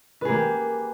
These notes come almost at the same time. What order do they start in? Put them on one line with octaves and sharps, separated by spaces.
B4 G#4 A#3 G4